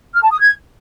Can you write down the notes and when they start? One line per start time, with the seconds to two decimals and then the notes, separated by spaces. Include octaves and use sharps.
0.15 F6
0.23 A5
0.31 D#6
0.39 G#6